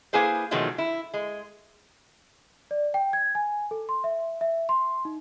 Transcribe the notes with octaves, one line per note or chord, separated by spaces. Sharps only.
A#3 E4 G#4 B4 C5
B2 D#3 F3 F#3 G#3 A3
E4
G#3
D5
G5
G#6
G#5
A4
C6
E5
E5
C6
D#4